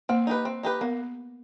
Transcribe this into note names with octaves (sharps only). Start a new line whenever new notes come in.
A#3 C4
D#4 G4 B4
C4
D#4 G4 B4
A#3 B3